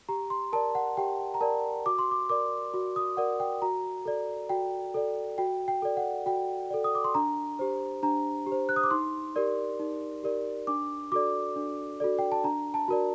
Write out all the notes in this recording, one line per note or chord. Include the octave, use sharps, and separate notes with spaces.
G4 A#5
C6
A#4 D5 A5
F#5
G4 G5
A#5
A#4 D5 A5
F#4 D6
C6
D6
A#4 D5 D6
F#4
D#6
A#4 D5 F#5
G5
F#4 A#5
A4 D5
F#4 G5
A4 D5
F#4 G5
G5
A4 D5
F#5
F#4 G5
A4 D5
D#6
D6
C6
D4 A#5
G4 C5
D4 A#5
G4
C5
F#6
D#6
D6
D#4 C6
G4 A#4 D5
D#4
G4 A#4 D5
D4 D6
F#4 A4 D5 D6
D4
F#4 A4 D5
G5
A5
D4 A#5
A5
F#4 A#4 D5